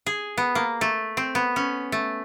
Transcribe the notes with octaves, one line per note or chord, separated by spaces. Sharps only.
G#4
B3
A#3
A3
C4
B3
C#4
A3